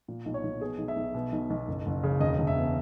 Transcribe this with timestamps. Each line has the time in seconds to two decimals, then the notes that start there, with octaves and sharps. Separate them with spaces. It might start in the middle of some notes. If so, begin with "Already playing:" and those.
0.08 A#2
0.26 B1
0.34 C#5
0.43 B1
0.60 B2 G#4
0.78 B1
0.88 E5
0.96 B1
1.14 B2
1.32 B1
1.50 B1
1.68 F#1
1.86 F#1
2.03 C#3
2.20 E1 D#5
2.39 E1
2.47 E5
2.56 B2